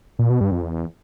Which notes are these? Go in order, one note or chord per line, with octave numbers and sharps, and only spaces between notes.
A#2
B2
G2
F2
E2